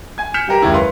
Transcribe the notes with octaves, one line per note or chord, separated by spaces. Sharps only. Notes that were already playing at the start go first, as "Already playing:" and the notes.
G#5 G#6
F6 G6 B6 C#7 E7
G3 G4 A#4
F#1 D#2 G#3 E4
B4 F5 C6